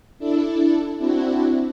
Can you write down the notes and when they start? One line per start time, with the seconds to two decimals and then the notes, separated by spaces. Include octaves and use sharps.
0.19 D4 E4 A4
0.97 C4 D4 E4 F#4